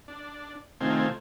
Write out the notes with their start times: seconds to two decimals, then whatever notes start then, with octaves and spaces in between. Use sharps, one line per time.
0.08 D4
0.81 C3 D#3 A3 C4 F4 G#5